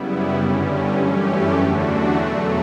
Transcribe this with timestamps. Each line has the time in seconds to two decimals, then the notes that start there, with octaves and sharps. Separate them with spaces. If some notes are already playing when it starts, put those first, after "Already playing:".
Already playing: F#2 C#3 G3 B3 E4
0.34 G2 D3 G3 C#4
0.94 F#2 E3 A3 C#4 G4
1.54 E2 D3 A3 D4 F#4
2.12 E2 B2 F#3 A3